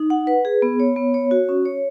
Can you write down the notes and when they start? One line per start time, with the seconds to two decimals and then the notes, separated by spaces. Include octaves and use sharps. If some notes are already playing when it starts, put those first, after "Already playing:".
Already playing: D#4
0.10 F#5
0.27 B4
0.45 G#4
0.62 B3
0.80 C#5
0.96 B3
1.14 C#5
1.31 F#4
1.49 C#4
1.65 C#5